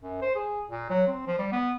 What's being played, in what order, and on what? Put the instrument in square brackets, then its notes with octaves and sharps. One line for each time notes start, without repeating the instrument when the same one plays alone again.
[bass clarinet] F#2
C5
G#4
A#2
F#3
C4
F3
G3
B3